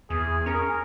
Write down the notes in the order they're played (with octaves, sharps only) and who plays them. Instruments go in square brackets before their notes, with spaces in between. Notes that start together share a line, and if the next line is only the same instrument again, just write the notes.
[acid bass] E2 [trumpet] G#4
[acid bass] C#4 [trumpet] A#4